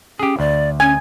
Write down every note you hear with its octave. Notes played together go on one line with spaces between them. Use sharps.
C#4 G4 G#4
D2 D5
C#4 G#5